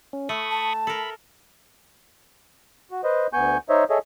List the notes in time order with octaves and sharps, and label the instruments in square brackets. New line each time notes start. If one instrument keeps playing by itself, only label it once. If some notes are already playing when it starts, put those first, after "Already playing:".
[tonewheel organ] C#4
[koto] A3 [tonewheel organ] B5 C#6 D#6
[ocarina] A5
[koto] A4 A#4 [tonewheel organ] B5
[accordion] F#4
B4 C5 D#5
D2 B3 G#5 C#6 G6
D#4 C5 C#5 D#5 E5
G#4 A4 C#5 D#5 E5